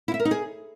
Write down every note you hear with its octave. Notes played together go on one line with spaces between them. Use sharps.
E4
E5
A#4
D#4
G#4